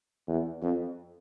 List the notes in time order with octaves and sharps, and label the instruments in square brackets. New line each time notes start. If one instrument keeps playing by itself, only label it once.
[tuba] E2
F2